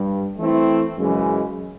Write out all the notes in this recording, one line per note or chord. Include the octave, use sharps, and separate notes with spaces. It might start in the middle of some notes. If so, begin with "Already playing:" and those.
Already playing: G2 G3
E3 A3 C4 E4
F#2 C#3 E3 G#3